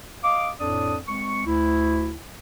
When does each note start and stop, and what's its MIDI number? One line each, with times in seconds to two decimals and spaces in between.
0.24 0.50 75
0.24 0.50 77
0.24 0.50 86
0.60 0.96 41
0.60 0.96 45
0.60 0.96 62
0.60 0.96 74
0.60 0.96 87
1.08 1.44 56
1.08 1.44 60
1.08 1.44 85
1.47 2.15 38
1.47 2.15 64